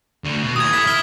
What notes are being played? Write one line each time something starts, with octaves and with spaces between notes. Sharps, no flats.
D2 D3
B2
D#2 E3 D#6 G#6
E4 A4 B6
E4 E5 F6 B6 G7